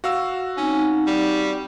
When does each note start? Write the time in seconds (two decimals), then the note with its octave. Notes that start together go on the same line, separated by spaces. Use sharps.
0.04 F#4 F5 E6
0.57 C4 C#4 D#4
1.07 G3